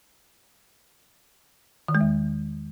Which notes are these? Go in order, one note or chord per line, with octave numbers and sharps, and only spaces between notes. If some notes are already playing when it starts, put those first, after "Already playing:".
D#3
G#3
E2